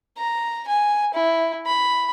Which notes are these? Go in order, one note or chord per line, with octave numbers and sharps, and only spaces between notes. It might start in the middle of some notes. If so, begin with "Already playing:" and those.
A#5
G#5
E4
B5